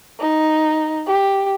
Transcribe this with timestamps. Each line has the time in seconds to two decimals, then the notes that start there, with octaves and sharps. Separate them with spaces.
0.20 D#4
1.07 G4